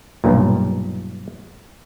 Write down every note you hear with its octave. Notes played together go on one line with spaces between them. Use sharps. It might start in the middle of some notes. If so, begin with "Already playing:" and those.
B1 G2 A#2